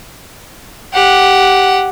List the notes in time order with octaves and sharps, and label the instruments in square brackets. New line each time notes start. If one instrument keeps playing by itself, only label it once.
[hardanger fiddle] G4 F#5